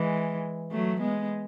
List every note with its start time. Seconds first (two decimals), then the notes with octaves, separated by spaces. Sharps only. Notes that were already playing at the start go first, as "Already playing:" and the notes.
Already playing: E3 G#3
0.72 F#3 A3
1.00 G#3 B3